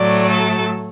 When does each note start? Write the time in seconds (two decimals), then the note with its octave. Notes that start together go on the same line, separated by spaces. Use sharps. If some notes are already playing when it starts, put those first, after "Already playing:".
Already playing: A2 F#3 A3 D5
0.29 A4